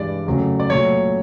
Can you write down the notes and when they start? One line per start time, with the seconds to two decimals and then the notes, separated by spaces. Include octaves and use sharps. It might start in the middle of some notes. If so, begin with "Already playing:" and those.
Already playing: G2 E3 G#3 D5
0.27 F2 C#3 F#3 A3
0.60 D5
0.69 A#2 F#3 A3 C#5